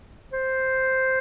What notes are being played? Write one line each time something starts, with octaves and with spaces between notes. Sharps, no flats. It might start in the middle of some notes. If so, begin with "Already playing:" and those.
C5